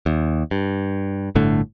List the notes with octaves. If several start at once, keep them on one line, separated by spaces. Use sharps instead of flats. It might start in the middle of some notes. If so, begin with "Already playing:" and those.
D#2
G2
G1 A2 D3 A3